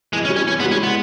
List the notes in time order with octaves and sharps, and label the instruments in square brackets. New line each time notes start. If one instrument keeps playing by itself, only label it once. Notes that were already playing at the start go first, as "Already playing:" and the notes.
[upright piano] E3 [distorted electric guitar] G#3
[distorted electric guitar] C#4
[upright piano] G3
[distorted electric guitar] C#4
[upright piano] E3 [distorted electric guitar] C#4
[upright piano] G#3 [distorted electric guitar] B3
[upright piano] G3
[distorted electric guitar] C#4
[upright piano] G#3 [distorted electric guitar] B3